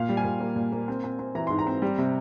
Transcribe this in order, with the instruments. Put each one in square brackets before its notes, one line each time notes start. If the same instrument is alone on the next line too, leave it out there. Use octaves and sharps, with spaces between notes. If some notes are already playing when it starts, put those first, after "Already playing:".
Already playing: [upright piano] A#2 F5
G3
G#5
A#2
A#3
A#2
A#3
C4
C4
C4
E3 A#5
G#2 C6
A#5
C4
G3
C3